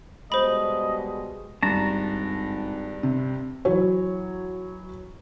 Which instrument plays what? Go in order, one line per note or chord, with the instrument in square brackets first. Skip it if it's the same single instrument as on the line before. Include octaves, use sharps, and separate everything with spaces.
[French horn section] B2 G3 G#3 [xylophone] C5 B5 [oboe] D#5
[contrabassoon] G#1 [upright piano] G2 [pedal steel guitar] A5 A#5
[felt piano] C3
E3 F#3 C#5